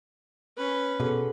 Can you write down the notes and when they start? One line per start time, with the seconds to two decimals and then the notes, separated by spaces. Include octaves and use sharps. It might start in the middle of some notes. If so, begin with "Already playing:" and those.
0.57 C#4 B4
1.00 B2 F#4 G#4 A4